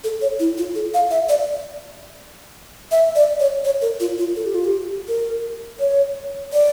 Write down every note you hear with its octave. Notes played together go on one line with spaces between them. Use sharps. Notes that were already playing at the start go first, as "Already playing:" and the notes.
A4
C#5
E4
F4
A4
F5
E5
D5
E5
D5
C#5
C#5
A#4
F4
F4
A4
G4
F4
G4
A#4
C#5
D5